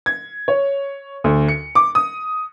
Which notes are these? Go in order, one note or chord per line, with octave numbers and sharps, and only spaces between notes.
G#6
C#5
D2
C#7
D6
D#6